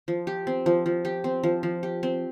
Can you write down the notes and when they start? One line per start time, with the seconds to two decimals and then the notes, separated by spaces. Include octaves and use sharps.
0.08 F3
0.27 G4
0.47 C4
0.66 F3
0.86 F3
1.05 G4
1.24 C4
1.43 F3
1.63 F3
1.83 G4
2.03 C4